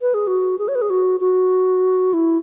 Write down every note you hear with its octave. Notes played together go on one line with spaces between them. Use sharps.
B4
G#4
F#4
G#4
C#5
B4
G#4
F#4
F#4
E4